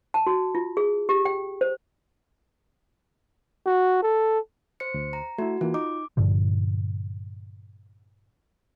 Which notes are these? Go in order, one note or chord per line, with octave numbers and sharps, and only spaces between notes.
A5
F#4
F4
G#4
G4
G5
C5
F#4
A4
C5 C#7
D2
A#5
A3 E4 F#4
E3 A#3 F4
D#4 D6
G2 A#2 D3 F3